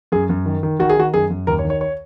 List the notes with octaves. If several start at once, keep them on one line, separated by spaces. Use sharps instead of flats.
F#2 G#4
F#2
D#3
D#3
D#3 F#4
G#4
D#3 F#4
F#2 G#4
F#2
D#2 A#4
C#5
D#3
C#5
C#5